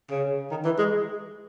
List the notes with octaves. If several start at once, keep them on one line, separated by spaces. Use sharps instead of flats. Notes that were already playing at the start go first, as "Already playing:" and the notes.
C#3
D#3
E3
G#3